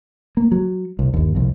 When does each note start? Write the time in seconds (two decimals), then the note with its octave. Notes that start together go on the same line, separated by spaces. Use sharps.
0.37 A#3
0.52 F#3
0.99 C2
1.14 G1 D#2
1.35 C2 F2